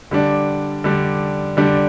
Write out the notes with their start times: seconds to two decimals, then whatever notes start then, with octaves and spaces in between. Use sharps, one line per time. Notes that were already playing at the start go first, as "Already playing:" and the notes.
0.11 D3 G3 D4
0.84 D3 G3 D4
1.57 D3 G3 D4